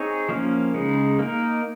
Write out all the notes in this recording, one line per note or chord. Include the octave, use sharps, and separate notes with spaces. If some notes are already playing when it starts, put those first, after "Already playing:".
Already playing: C4 D#4 G#4 C#5
F3 A#3 C#4
C#3 G#3 D#4
A#3 D#4 A#4